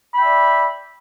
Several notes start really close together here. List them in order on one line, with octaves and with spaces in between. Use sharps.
B5 G5 E5 D5